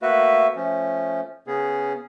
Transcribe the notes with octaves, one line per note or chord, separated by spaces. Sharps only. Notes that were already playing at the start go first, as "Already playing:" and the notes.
A3 A#3 F#4 B4 E5
F3 A3 C#4
C#3 B3 C#4 G#4